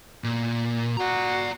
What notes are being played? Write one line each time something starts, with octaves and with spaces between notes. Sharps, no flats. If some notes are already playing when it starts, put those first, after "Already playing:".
A#2
F#4 D5 A#5